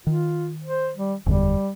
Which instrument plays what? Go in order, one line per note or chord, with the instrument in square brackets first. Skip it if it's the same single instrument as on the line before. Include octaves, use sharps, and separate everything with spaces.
[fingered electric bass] D#3 [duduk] F4
[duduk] C5
G3
[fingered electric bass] F#1 E2 D3 [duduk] G3